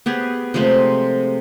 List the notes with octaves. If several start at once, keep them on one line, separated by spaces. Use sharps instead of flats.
B3 G4 G#4 B4
C3 F3 G#3 A3